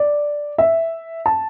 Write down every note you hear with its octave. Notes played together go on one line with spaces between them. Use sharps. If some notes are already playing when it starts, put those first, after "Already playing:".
Already playing: D5
E5
A5